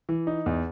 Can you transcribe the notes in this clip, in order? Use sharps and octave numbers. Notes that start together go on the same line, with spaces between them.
E3
D#4
E2